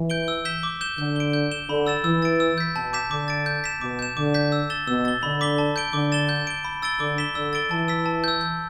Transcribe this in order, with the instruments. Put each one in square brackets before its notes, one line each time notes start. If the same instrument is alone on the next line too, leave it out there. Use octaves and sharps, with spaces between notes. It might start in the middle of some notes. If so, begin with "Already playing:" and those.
Already playing: [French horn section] E3
[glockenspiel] G6 D7 G7
E6
G6 B6 E7 G7
D6
G6 E7 G7
[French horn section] D3 [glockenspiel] G6
[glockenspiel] D7 G7
G6
E7 G7
[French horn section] D3 [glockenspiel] B5
[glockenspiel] E6 A6 E7
[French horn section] E3 [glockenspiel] E6
[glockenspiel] A6 D7
E6
G6 B6
[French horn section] B2 [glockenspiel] A5
[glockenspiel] D6 G6 B6 E7
[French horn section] D3 [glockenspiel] D6
[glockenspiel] A6 D7
G6
B6 E7
[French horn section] B2 [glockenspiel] D6
[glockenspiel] G6 E7
[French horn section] D3 [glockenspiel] D6
[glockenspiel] G6 B6
E6
A6 E7 G7
[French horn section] B2 [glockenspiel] E6
[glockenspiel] A6 G7
[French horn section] D3 [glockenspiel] B5
[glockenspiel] D6 B6 G7
A5
G6 D7 G7
[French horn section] D3 [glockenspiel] D6
[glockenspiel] A6 E7 G7
G6
D7 G7
B5
E6 A6 D7 G7
[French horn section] D3 [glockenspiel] D6
[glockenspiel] B6 E7 G7
[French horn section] D3 [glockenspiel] E6
[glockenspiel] A6 D7 G7
[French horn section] E3 [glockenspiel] A5
[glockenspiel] E6 B6
A5
E6 G6
G6